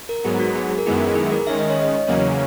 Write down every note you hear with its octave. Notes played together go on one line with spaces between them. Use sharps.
A#4
G#2 F#3 B3 G#4
F#4
G#4
G#4
A#4
F#2 D#3 G#3 B3 E4 G#4
G#4
A#4
D#3 G#3 C#4 E5
D#5
C#5
D#5
E2 C#3 F#3 A#3 C#4 C#5